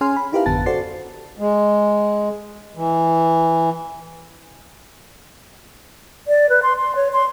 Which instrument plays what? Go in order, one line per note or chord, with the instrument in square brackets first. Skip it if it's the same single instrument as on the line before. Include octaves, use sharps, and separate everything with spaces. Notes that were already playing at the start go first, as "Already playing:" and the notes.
[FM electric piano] C#4 G#4 G#5 C6 F6
B5
D#4 E4 G4 A#4 B4 F5
G#1 F2 D3 B3 A5 A6
F#4 A4 C5 D5 A6 C7
[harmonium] G#3
E3
[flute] D5
B4
C6
C6
C#5
C6